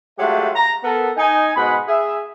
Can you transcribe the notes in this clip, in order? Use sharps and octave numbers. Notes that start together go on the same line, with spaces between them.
F#3 G#3 A3 F4 G4 E5
A#5
B3 A4 A#4
D#4 G#5
G#2 B2 G#3 F#5 B5
G#4 E5